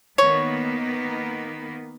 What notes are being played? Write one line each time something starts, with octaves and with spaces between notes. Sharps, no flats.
D#3 A#3 B3 C#5